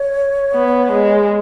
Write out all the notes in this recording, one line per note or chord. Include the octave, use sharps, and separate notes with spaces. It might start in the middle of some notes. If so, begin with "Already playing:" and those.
Already playing: C#5
B3
G#3